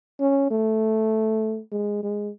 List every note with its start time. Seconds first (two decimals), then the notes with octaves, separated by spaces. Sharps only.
0.20 C#4
0.51 A3
1.71 G#3
2.03 G#3